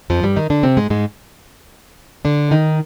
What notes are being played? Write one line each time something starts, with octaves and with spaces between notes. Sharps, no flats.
F2 F3
G2 G3
D#3 D#4
D3 D4
C3 C4
G#2 G#3
G#2 G#3
D3 D4
D#3 D#4